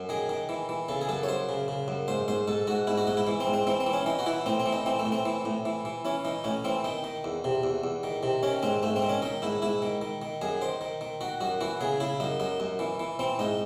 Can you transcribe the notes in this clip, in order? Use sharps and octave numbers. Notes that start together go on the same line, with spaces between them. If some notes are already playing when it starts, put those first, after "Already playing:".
Already playing: F#2
D#3 G#4
D#3
E3
E3
C#3 A4
G#4
F#2 A4
C#5
F#2 C5
C#3
C#3
F#2
G#2 C5
G#2 C5
G#2 A4
G#2 F#4
G#2 E4
F#4
G#2 D#4
E4
E3
C4
G#2
C4
E3 C4
C4
E3
C#4
E3 D#4
F#4
E3 E4
A2 C4
C4
E3
D#4
E3 C4
A3
A2
C4
E3
A2
E3
E3
E3 C#4
E3 D#4
A2 C#4
E3 C4
D#3 D#4
D#3
E2
C3
E2
E2
D#3
C3
D#3 C#4
G#2 C4
G#2 A3
C4
D#3
C#4
D#3 D#4
G#2 E4
G#2 E4
D#3
D#3
D#3
F#2 G#4
D#3 C5
D#3
D#3
D#3 F#4
F#2 F#4
E3 F#4
C#3 G#4
C#3 E4
F#2 D#4
F#2 D#4
F#2
E3
E3
E3 C4
G#2 D#4